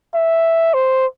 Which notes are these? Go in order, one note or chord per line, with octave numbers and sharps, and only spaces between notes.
E5
C5